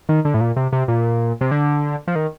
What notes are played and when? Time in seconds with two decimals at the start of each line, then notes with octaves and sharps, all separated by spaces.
0.09 D#3
0.25 D3
0.34 A2
0.41 A#2
0.56 C3
0.72 C3
0.88 A#2
1.41 C3
1.51 D3
2.07 F3
2.15 D#3